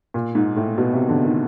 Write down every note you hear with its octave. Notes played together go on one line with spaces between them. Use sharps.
A#2
G#2
A2
B2
C3
D3
D#3